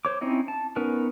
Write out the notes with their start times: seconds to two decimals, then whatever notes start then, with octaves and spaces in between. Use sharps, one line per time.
0.05 C5 C#5 D6
0.21 C4 C#4 D#4 E4 D#5
0.48 A5
0.76 B3 C#4 D#4 A#4 B4